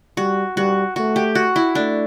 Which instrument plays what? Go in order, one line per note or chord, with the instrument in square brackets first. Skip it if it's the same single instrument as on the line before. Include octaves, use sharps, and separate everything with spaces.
[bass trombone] G3 [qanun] F#4
[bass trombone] G3 [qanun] F#4
[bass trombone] A3 [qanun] F#4
[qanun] G4
F#4
E4
[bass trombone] A3 [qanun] D4